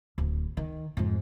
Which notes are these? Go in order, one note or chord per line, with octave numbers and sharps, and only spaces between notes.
D1
D#3
F2 G#2